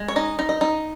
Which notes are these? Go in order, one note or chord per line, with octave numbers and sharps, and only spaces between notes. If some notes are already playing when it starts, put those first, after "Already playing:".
Already playing: G#3
C#5
D#4 D#5
D#4
D#5
D#4